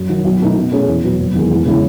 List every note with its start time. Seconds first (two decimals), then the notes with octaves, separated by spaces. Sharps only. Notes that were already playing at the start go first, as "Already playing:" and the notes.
Already playing: F#2
0.09 D#3 F#3
0.25 B1
0.40 B2 A3 D#4
0.56 B2
0.72 A3 C#4 G#4 C#5
0.88 E2
1.04 B2 F#3 B3
1.19 F#1
1.35 E2 D#3 G#3
1.50 E2
1.65 C#3 G#3 C#4 E4